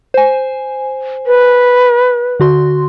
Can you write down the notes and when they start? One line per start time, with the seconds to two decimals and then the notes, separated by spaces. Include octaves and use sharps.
0.14 C5 G#5
1.27 B4
2.40 D3 F#4 C6